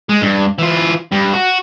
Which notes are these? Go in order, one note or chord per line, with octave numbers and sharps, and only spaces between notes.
G#3
G2
E3 F4
G2
F#4